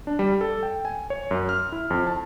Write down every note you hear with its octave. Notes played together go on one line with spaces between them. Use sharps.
D4
G3
A4
G5
G#5
C#5
F#2
F6
E4
F2
A5